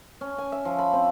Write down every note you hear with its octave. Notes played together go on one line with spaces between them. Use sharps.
C#4
G#5
E5
F3
B5
C4